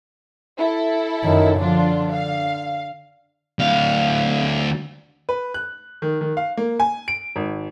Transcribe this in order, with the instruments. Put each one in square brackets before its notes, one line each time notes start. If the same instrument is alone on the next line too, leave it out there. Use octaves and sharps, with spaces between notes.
[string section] E4 A4
[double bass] F#2 D#3
[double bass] D3 [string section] F3 D4 F4
[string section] F5
[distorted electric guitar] D2 F5
[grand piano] B4
F#6
D#3
D#3
F5
A#3
G#5
D7
G#1